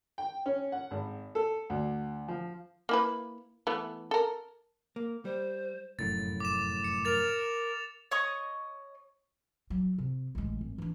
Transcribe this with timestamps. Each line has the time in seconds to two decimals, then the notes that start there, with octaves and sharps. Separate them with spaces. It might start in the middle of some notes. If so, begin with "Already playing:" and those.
0.18 G5
0.46 C#4
0.72 F#5
0.91 G#1
1.35 A4
1.70 D2
2.28 F3
2.89 A#3 E4 B4
3.67 E3 A3 B3
4.11 A4 A#4
4.96 A#3
5.25 G3 C5
5.99 F1 F#2 A2 A6
6.40 D6 E7
6.84 C#7
7.05 A#4 A6 F7
8.11 C#5 D#5 C#6 D#6
9.70 F#3
9.98 C3
10.35 A1 G#3
10.61 G#1
10.78 E3 D4